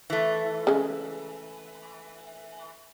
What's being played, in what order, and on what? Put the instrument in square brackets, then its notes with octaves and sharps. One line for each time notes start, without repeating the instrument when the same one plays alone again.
[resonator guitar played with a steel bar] E3 A3
[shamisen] C#3 G#3